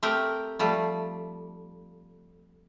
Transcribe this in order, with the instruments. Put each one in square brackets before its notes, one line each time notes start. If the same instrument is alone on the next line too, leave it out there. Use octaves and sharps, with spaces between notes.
[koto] A3 C4 G4 A#4 G5
F3 G3 A3